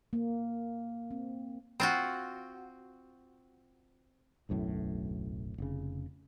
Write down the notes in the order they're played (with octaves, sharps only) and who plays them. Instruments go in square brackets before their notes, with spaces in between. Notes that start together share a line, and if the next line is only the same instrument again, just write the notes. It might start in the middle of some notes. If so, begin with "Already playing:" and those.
[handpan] A#3
C4
[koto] C4 F4 F#4
[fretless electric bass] D1 B1 F#2 A2
F1 C#3